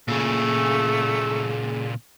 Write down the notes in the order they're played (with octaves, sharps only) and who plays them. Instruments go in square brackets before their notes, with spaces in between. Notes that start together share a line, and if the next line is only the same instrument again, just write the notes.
[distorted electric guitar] A#2 C#3 [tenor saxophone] A3 [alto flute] G#4